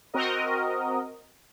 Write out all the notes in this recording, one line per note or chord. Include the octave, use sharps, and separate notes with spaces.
C4 F#4 A#4 D#5